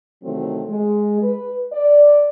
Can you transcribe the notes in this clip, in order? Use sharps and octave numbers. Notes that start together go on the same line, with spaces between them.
C3 D#3 E3 F#3 A3 C4
G#3
B4
D5